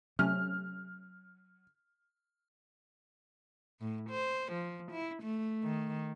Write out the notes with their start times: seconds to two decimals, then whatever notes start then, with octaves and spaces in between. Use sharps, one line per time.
0.19 C3 F#3 A3 C#4 F6
3.81 A2
4.10 C5
4.52 F3
4.92 E4
5.23 A3
5.63 D#3